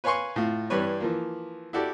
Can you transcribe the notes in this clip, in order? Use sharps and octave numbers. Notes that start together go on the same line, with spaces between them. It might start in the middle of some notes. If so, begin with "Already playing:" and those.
B4 C#5 F5 G#5 C6 C#6
A2 F4
G2 E3 G3 D4 B4 C#5
E3 F3 A#3
E4 F#4 G4 A4 D5